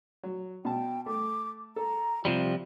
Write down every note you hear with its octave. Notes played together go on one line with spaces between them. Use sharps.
F#3
B2 G5 A5
A3 D6
A4 A#5
C3 F3 G3 F4